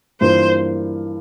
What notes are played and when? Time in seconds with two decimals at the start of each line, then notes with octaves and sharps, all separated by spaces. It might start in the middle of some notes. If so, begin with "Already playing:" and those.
0.21 G2 E3 A#3 F4 A#4 C5